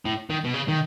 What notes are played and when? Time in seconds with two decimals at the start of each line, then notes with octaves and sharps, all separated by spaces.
0.05 A2
0.30 D#3
0.44 B2
0.54 C#3
0.68 D#3